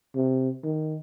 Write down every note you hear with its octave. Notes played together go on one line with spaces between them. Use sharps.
C3
D#3